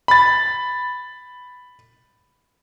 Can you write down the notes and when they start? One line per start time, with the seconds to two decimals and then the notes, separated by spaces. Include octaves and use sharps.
0.08 B5 A6